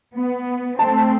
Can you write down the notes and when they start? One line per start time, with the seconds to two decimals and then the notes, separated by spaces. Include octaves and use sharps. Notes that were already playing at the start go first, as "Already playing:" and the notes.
0.16 B3
0.79 A3 C4 A5